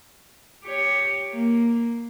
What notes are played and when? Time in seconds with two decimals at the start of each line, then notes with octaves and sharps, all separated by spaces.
0.65 G4 C#5
1.33 A#3